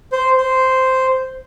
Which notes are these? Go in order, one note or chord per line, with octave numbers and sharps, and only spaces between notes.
C5
C5